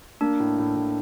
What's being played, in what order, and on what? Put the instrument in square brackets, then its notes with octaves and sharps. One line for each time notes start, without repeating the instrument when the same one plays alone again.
[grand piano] A#3 [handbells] D4
[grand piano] A2
A2
A2